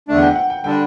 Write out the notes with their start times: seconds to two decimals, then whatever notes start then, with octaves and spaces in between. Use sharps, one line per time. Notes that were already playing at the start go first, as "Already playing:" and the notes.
0.08 E2 D3 A3 D4
0.18 F#5
0.22 G5
0.36 F#5
0.50 G5
0.63 D3 G3 D4 G5